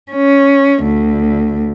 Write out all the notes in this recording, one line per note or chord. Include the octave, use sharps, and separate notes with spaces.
C#4
D2